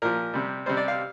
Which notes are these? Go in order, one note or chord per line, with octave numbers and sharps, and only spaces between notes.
A#2 F3 A#4
C3 G3
C3 G3 C5
D5
F5